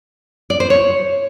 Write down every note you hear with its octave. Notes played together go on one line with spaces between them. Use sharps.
D5
C5
C#5